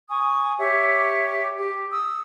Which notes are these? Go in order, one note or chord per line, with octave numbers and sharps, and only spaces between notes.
G#5 C#6 D#6
G4 C#5 E5
G4
D#6 E6